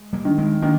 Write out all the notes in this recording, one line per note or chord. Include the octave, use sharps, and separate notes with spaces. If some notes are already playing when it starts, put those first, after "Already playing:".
Already playing: G#3
G3 A#3
D#3
G#3 C4
D#3 A#3 D4